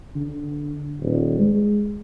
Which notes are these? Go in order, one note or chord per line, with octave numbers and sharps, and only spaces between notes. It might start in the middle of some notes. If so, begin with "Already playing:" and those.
D3
D#1
G#3